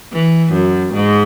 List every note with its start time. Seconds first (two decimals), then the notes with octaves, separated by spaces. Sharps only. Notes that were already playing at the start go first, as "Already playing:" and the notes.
0.12 E3
0.53 F#2
0.94 G#2